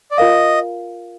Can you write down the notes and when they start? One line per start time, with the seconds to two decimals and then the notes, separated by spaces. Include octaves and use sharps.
0.11 D5
0.17 F4 A#4 D#5 F5